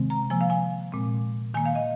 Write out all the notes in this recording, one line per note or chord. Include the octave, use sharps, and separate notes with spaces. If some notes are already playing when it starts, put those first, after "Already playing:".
Already playing: C3 D#3 G#3 C4
A#5
C3 F3 A#3 G#5
F5
G#5
A#2 G#3 C4
D#3 A#3 G#5
F5
D#5